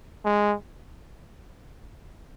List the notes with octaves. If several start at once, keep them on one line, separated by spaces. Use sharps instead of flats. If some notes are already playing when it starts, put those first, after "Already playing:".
G#3